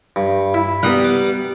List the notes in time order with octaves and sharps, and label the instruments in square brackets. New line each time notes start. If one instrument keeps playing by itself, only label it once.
[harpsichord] G2
E4
[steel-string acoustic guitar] G3 B3 [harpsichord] F#5 A#5 D#6
[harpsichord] D6